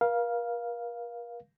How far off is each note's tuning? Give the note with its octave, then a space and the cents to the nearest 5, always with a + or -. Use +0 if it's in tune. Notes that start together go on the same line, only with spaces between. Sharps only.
A#4 +40 F5 +0